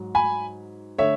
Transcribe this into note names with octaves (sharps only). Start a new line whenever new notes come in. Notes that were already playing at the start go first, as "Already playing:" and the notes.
Already playing: G#2 F#3
G#5 B5
D3 A3 C#5 E5